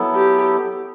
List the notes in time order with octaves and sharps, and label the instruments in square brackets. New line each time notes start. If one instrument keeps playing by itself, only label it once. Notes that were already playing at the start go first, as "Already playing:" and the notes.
Already playing: [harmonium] F#3 B3 E4 A4
[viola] G4